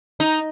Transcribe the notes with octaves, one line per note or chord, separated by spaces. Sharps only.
D#4